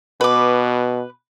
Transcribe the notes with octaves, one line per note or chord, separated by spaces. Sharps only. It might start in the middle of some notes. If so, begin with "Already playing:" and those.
B2 B4 D6